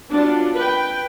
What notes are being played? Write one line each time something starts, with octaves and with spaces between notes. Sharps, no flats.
F#3 B3 D4 F4
B4 G5